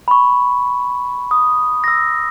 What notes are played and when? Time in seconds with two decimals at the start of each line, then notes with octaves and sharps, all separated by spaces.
0.08 B5 C#6
1.31 D#6
1.84 E6 A#6